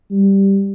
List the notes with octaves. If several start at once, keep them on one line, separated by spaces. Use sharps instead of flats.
G3